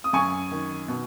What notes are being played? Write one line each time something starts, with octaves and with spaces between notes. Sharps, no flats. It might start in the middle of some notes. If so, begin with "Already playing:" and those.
D#6
F#2 G#5 C#6
D#3
B2